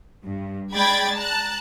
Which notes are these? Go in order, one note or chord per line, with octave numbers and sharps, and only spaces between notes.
G2
G#3 D5 G5 B5 G#6 A6
A5 A#5 F#6